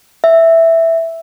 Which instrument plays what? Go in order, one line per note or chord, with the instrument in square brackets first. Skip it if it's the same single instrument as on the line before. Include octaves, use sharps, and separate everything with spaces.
[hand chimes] E5